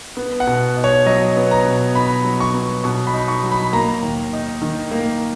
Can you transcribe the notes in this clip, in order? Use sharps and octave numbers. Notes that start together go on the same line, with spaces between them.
B3
F#5
B2
D#4
C#5
F#3 D#5
B3
A#5
B2
D#4 B5
F#3
C#6
B3
B2 C#6
B5
D#4
C#6
F#3
B5
A#3 A#5
D#2
D#4
D#3
A#3